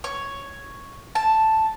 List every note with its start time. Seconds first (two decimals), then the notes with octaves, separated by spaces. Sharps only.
0.04 C#5
1.15 A5